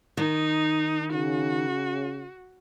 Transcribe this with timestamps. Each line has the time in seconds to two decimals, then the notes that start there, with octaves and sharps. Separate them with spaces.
0.17 D#3 D#4
1.13 C#3 F#4